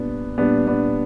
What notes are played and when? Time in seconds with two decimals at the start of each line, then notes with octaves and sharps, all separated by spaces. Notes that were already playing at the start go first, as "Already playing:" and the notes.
Already playing: A#2 G3 B3 D4
0.38 A#2 G3 B3 D4
0.67 B3 D4